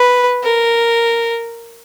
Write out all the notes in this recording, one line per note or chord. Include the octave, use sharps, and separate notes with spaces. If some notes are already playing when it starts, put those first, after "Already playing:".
Already playing: B4
A#4